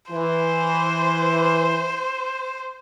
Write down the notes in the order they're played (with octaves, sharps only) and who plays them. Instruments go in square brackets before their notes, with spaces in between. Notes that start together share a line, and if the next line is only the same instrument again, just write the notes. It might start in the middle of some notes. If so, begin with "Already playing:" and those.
[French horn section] E3 [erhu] C5